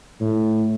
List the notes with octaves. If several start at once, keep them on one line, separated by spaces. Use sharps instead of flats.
A2